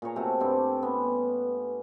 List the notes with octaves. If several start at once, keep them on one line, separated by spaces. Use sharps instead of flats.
A#2 G#4 C#5 A#5
C3 A3 F#4
G2 G3 C4 D4
B3 C#4